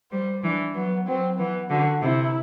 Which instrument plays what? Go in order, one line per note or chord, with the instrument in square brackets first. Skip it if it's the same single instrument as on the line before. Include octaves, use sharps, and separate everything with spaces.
[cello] G3 [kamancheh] C5
[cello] E3 [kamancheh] D4
[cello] F#3 [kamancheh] B3
[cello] F#3 [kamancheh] C4
[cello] E3 [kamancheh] B3
[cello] D3 [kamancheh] F#4
[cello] C3 [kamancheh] E4